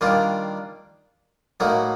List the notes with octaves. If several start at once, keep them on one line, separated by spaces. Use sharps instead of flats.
D#3 G3 A#3 D4 F4
A2 F#3 A#3 D#4